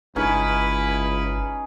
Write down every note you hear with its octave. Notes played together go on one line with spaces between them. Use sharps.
G1 C#2 C#4 D#4 E4 G#4 B4